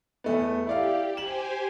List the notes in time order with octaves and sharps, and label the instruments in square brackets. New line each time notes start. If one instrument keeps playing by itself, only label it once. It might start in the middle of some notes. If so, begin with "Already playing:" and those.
[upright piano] E2 A3 B3
[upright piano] E4 D5 F5 [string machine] G4
[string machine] G4 C5 G#5 [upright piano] E7 F#7